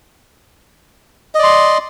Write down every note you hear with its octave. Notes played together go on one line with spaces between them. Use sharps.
D5 D#5 C6